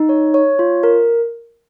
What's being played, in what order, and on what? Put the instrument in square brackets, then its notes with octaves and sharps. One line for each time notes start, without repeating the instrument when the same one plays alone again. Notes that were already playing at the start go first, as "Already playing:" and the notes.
Already playing: [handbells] D#4
C#5
C#5
F4
A#4